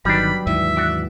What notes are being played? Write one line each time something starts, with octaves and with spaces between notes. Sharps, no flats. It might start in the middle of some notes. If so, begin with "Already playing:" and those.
G1 D#3 F#3 G3 B3 D4 B5
D#2 G#2 E3 E5
D4 F#4 F#5 D7